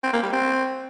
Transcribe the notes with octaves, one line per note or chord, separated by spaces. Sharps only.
C4
A#3
G3
C4